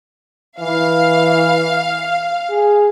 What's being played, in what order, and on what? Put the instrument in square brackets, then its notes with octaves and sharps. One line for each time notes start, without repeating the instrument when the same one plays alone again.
[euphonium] E3 [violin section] F5
[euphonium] G#4